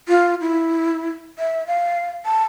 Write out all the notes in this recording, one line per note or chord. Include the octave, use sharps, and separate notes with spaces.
F4
E4
E5
F5
A5